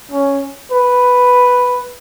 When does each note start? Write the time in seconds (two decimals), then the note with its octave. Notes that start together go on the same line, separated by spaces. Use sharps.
0.11 C#4
0.71 B4